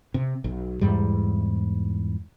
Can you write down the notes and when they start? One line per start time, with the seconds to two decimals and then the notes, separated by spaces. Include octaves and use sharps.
0.14 C3
0.44 B1
0.81 E2 G#2 G3